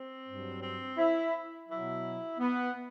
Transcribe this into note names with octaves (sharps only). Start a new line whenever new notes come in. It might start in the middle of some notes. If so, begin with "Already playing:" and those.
Already playing: C4
G2 F#3
C4
E4
B2 F#3 E4
B3